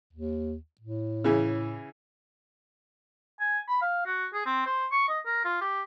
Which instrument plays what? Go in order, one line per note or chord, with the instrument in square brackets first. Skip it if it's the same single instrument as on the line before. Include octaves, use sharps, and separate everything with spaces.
[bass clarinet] D#2
A2
[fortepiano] C#3 E3
[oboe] G#5
B5
F5
F#4
G#4
C4
C5
C#6
D#5
A#4
F4
G4